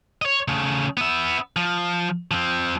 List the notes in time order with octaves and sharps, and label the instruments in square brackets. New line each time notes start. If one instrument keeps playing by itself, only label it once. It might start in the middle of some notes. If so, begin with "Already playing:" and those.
[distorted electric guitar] C#5 D#5
C#3 A3
B3 E5
F3
F3 C4